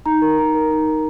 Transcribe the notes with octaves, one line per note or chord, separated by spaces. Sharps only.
D#4 A#5
A#4
D#4 A#5
A#4
D#4
A#4